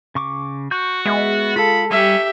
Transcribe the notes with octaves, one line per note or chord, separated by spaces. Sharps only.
C#3 C#6 D6
F#4 C#6 G6
G#3 B3 E5
F4 G#4 A4 F5 B5
G3 C#4 G4 E5